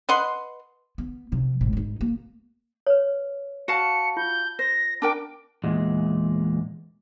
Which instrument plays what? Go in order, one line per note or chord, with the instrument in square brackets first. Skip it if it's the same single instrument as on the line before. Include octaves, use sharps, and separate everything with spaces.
[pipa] B4 D#5 F#5 C6
[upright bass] B3
C3 F3
G#1 A2
G#2 D#4
A#3
[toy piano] B4 C#5
[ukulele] F#4 F5 A5 [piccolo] C#7
[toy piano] F4 [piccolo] G6
[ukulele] C5 [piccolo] A#6
[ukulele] D4 A#4 G5 [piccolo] D6
[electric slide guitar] E2 A#2 G#3